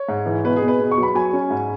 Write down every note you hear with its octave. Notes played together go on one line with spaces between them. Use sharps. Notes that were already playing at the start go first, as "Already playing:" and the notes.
Already playing: C#5
G#2
E3
B2 B4
G#4
B2
B4
B2
C#6
F#3
B5
F#3 G#5
C#4
G#2